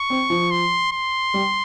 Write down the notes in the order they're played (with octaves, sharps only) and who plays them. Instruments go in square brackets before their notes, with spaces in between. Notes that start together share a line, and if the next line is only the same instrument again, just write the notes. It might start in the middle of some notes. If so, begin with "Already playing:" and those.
Already playing: [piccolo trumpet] C#6
[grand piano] C4
F3
[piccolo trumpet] C6
C6
[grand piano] G3